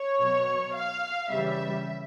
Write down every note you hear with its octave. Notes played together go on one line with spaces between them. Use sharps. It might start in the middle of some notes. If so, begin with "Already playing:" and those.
Already playing: C#5
B2 F#3
F5
C#3 E3 G3 E5